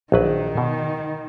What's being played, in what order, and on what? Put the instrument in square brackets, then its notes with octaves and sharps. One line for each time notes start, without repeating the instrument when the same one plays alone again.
[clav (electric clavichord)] A#1 F#3 B4 [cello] D#3
[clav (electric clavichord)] B2